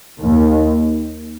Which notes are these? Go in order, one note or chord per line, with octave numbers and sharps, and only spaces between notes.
D#2